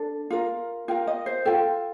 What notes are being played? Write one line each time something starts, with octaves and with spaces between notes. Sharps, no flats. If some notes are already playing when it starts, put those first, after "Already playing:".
Already playing: D4 A4
F4 A#4
F4 A#4 G5
D#5
C5
F4 A4 G5